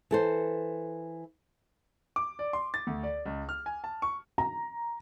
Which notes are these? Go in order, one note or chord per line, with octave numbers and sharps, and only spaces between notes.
E3 A4 C5
D6
D5
C6
A6
D2
D5
C#2
F6
G#5
A5
C#6
A#5